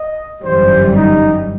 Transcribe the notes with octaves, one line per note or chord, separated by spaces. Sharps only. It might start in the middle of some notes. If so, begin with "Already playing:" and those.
Already playing: D#5
G1 F#2 E3 G3 C5
D#4